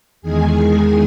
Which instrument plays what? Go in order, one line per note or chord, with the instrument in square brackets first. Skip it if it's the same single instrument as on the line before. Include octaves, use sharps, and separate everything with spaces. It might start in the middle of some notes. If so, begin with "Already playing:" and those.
[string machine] E2 D#3 G#3 G#4 G#5